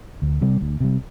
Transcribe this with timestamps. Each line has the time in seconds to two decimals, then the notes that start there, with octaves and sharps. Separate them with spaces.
0.22 D2
0.41 C3 G3
0.61 D2
0.80 C3 G3